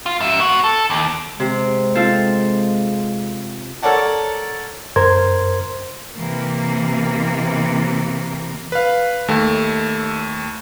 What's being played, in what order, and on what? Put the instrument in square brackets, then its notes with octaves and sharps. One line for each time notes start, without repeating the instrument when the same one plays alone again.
[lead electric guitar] F4
G#2 E5
B3 F#4
A4
D#2
[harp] C3 [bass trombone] G#3
[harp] C4 F4 A4
[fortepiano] A4 A#4 C#5 D5 F#5 A5
[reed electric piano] F#2 A#4 C5 C6 G#6
[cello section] C3 E3 A#3
[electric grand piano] B4 F5
D#2 A3